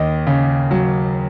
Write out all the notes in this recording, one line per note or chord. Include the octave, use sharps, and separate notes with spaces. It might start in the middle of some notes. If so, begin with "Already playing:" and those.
Already playing: D#2 D#5
C#3
F#3